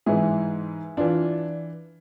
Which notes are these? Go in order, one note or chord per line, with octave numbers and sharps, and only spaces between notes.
G#2 E3 E4 G#4
E3 D4 F4